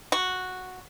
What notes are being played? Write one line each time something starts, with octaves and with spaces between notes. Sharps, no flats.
F#4